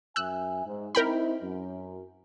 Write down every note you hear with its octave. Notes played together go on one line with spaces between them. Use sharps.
F#2 E5 G#5 E6 F#6
G#2
C4 D#4 E4 A#4 G5 B5
F#2